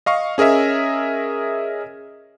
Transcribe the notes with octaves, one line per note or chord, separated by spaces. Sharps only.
D#5 F5 C#6
C#4 G#4 A#4 D#5 E5